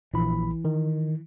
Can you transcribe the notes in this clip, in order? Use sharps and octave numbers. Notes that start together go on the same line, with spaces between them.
A#1 E3 B5
D#3